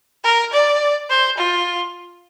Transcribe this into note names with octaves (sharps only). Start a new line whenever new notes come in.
A#4
D5
C5
F4